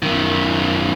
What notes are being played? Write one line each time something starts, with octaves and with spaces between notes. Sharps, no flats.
F#2 D#3